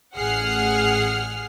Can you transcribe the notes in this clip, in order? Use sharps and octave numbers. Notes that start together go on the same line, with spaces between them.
A1 G#4 F#5 F6 C7